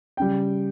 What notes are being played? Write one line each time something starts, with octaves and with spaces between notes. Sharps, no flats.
C#3 G3 G5